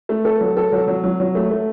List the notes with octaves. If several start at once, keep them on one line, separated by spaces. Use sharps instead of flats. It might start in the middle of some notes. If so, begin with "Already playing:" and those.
A3
A4
F#3
A4
F#3
F#3
F#3
F#3
A3
A3